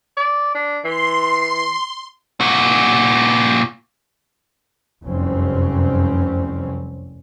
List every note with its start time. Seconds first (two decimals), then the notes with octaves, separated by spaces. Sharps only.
0.17 D5
0.55 D4
0.84 E3 C6
2.40 A#2 F#4
5.04 F1 C2 F#2 G3 C4 C#4